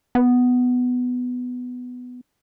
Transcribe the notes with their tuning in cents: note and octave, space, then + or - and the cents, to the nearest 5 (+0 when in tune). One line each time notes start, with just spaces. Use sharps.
B3 +10